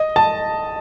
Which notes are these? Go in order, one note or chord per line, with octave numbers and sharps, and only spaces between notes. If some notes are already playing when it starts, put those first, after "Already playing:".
Already playing: D#5
A5